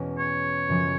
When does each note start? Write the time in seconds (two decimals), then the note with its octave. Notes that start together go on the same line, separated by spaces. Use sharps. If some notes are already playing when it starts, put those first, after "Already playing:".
Already playing: E2 B2 G#3 C#4 F#4
0.18 C#5
0.69 F#2 C#3 F3 G#3